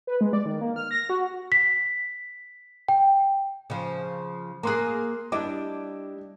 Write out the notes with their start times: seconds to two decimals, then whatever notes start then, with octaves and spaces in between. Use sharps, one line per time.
0.07 B4
0.21 G#3
0.33 D5
0.46 D#3
0.61 A#3
0.76 F6
0.91 A#6
1.09 F#4
1.52 B6
2.88 G5
3.70 C#3 F3
4.63 A#3 G#4 A#5 C6 F#6
5.32 G3 D4 E4 D#5 D6